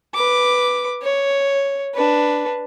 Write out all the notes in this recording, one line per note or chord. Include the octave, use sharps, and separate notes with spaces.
B4 D6
C#5
D4 B4